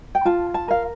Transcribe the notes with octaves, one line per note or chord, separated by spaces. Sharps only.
G5
F4 A5
A5
A#4 F5